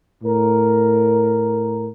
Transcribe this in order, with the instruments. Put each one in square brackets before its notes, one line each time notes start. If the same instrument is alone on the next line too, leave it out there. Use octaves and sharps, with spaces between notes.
[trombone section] A2 A#4